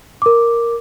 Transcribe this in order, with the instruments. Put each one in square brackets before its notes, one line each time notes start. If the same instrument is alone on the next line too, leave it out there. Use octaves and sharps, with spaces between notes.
[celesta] A#4 D6